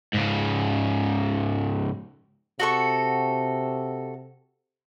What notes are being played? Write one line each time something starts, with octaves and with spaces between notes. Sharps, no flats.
G#2 C#3
C3 F#4 A4 C#6